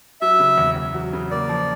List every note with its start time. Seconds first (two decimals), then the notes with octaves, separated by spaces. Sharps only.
0.21 F#3 E5
0.40 C#3
0.58 E2
0.76 E2
0.94 F#3
1.13 C#3
1.31 A#3 D5
1.49 F3